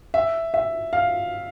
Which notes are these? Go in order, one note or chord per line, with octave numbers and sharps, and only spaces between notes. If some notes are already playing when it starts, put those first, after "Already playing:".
E5
E5
F5